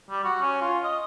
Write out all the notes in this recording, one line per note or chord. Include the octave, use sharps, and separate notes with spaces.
G3
F#4
C#4
F4
D#5